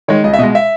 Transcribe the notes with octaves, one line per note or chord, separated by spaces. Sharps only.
D#3 G#3 C#5
C#2 D#5
E5
B2 G#3 D#5
E5